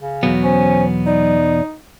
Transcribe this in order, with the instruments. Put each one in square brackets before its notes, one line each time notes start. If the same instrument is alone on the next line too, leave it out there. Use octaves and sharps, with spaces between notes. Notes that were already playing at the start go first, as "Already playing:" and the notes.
[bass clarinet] C#3
[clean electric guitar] E2 B2 B3 [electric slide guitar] F#3
[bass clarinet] C#4 [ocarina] C5
[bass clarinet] D#4 [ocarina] D5